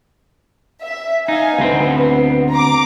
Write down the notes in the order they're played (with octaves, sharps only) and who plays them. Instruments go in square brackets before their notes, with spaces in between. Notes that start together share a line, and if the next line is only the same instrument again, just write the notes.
[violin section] E5
[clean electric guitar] D#4 [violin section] F5 G#5
[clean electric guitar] D2 C4 [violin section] B3
[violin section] A#5 D6